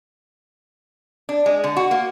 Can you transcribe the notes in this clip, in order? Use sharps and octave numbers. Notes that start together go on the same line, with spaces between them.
D4
G#3
D3
F#4
A#3